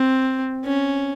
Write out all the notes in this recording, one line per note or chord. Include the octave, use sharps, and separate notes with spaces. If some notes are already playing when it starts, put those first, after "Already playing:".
Already playing: C4
C#4